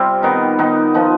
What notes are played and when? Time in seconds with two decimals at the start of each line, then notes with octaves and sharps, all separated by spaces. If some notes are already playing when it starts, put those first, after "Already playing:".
Already playing: C3 G3 C4 F4
0.23 D#3 B3 D#4
0.59 D#3 B3 D#4
0.94 F3 B3 D#4